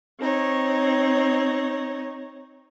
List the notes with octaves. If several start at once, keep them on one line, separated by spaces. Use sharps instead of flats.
C4 D#4 C#5